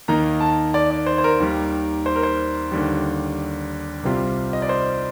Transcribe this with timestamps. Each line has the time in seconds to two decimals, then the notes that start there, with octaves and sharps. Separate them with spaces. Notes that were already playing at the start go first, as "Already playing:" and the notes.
0.08 D#2 D#3 A#3 D#4 A#5
0.40 A5
0.74 D5
0.91 D5
1.06 C5
1.18 C5
1.24 A#4
1.40 D#2 D#3 G3
2.06 C5
2.16 A#4
2.23 C5
2.71 D#2 D3 G3
4.03 C2 C3 G3 C4 F4
4.53 D#5
4.62 D5
4.69 C5